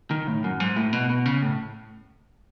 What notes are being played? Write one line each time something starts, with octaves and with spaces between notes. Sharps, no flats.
D#3
A2
F#2
G#2
A2
B2
B2
C#3
A2